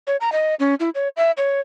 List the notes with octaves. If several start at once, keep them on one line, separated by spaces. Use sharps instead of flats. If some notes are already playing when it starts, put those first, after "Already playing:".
C#5
A#5
D#5
C#4
E4
C#5
E5
C#5